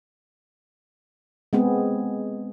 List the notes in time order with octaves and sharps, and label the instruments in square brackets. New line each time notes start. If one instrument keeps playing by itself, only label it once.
[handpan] G#3 B3 C4 G#4